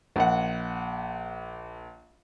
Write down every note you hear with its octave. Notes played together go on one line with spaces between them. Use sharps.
A#1 F#5